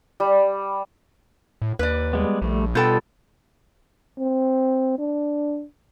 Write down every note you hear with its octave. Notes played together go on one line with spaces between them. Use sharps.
G3
A2
D#2 B4 D5
G3 G#3 B3
A#1 G3 A3
B2 G3 B3 F4 A4 G5 G6
C4
D4